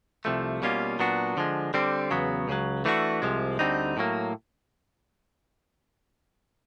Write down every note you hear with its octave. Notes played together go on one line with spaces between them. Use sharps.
C2 C3 F3 A3
B2 G3 A#3 C#4 F4
A#2 F#3 B3 D4 F#4
D3 F3 G#3
D3 G3 C4
E2 C#3 F#3 B3
C#2 C#3 F#3
E3 A3 D4 F#4
C2 C3 F3 G#3
D2 D3 G3 C4 D#4
A2 F#3 A#3